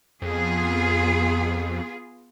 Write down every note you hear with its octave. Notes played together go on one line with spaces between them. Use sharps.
F2 B3 F4 G#4